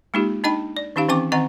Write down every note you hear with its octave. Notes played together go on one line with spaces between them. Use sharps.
G#3 A#3 D#4 F4 G4
D4 D#4 D#5 G5 B5
D5
D#3 C#4 D#4 G4 F5
E3 C4 C#4 G5 C#6 D6
D#3 C4 D#5 F#5 A#5